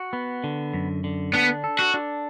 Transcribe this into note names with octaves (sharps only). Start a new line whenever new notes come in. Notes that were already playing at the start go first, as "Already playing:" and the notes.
Already playing: F#4
B3
D3
F#2
D3
B3 D4
A4
F#4
D4